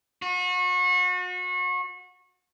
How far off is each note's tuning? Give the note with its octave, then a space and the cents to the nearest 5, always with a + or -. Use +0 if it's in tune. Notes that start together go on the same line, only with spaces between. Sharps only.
F#4 -35